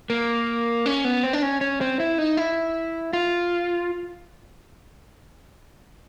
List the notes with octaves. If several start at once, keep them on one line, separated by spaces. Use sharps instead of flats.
A#3
C#4
B3
C4
D4
C#4
C#4
C4
E4
D#4
E4
F4